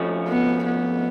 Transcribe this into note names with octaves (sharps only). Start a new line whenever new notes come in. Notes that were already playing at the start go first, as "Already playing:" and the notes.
Already playing: F2 F3 A3 C#4 F#4
B3
B3